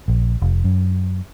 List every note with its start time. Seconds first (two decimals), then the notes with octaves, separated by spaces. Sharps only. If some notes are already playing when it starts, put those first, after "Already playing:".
0.08 A#1
0.42 F1
0.64 F#2